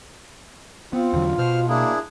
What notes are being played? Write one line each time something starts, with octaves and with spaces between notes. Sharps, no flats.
B3 C4 F4
E2 D3 F#3
B2 C5 F6
A#3 D4 E4 G#4